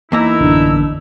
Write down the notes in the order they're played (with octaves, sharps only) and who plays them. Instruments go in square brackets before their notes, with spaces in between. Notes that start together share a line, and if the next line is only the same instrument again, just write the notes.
[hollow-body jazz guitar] E2 A#3 A#5 [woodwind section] D#4 E4 E6
[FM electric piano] A1 F#2 D3 [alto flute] D4